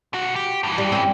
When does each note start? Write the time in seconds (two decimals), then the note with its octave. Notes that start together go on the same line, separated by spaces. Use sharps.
0.13 B1 F#4
0.36 G4
0.63 G2 E3
0.78 G3
0.92 C4 C#4